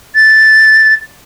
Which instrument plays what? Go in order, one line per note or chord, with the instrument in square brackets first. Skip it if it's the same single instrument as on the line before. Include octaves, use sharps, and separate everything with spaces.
[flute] A6